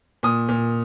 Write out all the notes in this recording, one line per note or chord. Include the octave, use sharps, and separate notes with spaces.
A#2 D#6
A#2